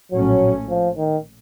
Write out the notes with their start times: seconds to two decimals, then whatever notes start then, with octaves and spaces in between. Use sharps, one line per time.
0.12 A#1 A2 F#3 A3 C#4
0.69 F3
0.97 D#3